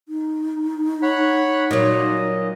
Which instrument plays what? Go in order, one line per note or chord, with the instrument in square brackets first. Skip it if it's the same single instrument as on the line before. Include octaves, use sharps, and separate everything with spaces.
[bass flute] D#4
[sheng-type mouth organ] C#5 F#5 B5
[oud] A#2 F#3 [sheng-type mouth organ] D#5